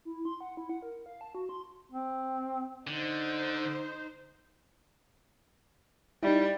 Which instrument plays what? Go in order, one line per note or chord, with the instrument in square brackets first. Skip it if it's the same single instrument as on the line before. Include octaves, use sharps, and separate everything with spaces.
[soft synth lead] E4
C6
F#5
E4
F#5
A#4
F5
A5
F#4
C6
[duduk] C4
[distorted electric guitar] D3 [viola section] D#4 C5
[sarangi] G3 [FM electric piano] D#4 E4